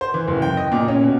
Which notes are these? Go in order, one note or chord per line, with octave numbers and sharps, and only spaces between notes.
C5
E3
F#1
G5
D#5
A#2
C#4
B2